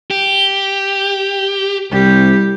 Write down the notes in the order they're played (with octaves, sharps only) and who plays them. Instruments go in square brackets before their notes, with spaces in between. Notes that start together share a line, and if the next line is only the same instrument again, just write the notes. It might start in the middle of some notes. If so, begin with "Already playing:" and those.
[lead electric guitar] G4
[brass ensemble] C2 [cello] G3 G4